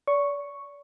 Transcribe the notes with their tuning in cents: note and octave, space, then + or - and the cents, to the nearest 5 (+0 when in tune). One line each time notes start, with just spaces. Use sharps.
D5 -40 C#6 +0